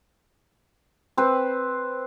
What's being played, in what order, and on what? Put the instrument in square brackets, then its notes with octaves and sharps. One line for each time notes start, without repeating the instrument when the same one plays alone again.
[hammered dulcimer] C4 B4